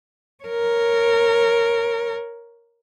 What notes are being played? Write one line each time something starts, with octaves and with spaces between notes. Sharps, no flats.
A#4 C#5